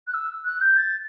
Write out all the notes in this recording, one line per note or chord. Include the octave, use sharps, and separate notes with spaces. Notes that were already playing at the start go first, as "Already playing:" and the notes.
F#6
E6
F#6
G6
A6